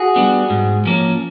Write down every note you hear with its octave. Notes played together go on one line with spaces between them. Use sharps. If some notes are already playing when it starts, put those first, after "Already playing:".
Already playing: F#4 G#4
G3 B3 D4
G#2
F3 A#3 C#4